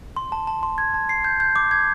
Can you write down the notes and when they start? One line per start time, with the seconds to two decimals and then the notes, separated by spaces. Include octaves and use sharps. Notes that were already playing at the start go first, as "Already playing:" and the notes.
0.16 C6
0.32 A5
0.47 A5
0.63 C6
0.78 G#6
0.94 A5
1.09 C7
1.24 G6
1.40 G6
1.56 D6
1.71 G#6